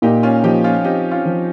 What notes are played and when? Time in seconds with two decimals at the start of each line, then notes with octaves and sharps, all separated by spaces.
0.02 A#2 D#4 G4
0.23 C#4 F4
0.44 F3 D#4 G4
0.64 C#4 F4
0.84 C4 D#4 G4
1.11 C#4 F4
1.25 F3